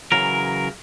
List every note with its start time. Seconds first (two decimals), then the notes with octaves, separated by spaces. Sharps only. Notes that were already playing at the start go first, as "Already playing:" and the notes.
0.12 C#3 E3 F#3 A#4